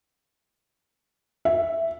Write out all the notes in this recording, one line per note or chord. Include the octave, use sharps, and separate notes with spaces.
E5